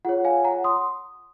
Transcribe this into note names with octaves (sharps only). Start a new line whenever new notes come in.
F4 G#4 C#5 F#5
F5 G#5
F#5 A#5
C6 D#6